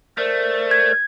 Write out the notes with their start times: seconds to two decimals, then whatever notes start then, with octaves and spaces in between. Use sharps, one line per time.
0.18 A3 A#4 C5 D5
0.71 G#6